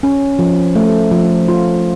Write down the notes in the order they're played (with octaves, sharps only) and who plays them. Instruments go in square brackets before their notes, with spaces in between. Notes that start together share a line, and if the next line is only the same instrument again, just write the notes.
[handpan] C#4
F3
A3
F3
F4